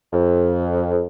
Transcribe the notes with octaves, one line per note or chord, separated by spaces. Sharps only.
F2